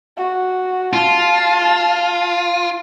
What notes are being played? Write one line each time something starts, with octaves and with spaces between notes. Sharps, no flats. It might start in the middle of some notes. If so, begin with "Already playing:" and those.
F#4
F4 A5